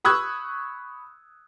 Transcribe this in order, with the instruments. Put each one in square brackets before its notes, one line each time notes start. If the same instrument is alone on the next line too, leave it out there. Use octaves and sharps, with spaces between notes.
[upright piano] B5 C#6 D#6 E6 F#6 G#6